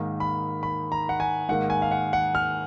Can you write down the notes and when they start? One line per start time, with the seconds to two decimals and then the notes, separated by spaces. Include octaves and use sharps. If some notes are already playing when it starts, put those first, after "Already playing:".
Already playing: G#2 D#3 A#3
0.20 B5
0.63 B5
0.92 A#5
1.09 F#5
1.20 G#5
1.49 G#2 D#3 A#3 F#5
1.70 G#5
1.82 F5
1.91 F#5
2.13 F#5
2.35 F6